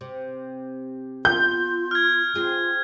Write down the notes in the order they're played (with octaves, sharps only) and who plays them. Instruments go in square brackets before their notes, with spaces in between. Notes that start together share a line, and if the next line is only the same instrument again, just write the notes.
[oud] C3
[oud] B3 [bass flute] F4 [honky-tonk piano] G6
[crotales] F6 G#6
[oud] C4 G#4 [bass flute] F4